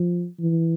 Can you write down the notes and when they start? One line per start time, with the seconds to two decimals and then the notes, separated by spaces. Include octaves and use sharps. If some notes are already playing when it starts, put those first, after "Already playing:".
Already playing: F3
0.40 E3